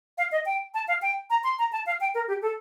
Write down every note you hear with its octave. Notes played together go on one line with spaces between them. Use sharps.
F5
D#5
G5
A5
F5
G5
A#5
C6
A#5
A5
F5
G5
A#4
G4
A4